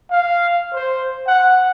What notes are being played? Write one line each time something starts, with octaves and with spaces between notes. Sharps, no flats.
F5
C5
F#5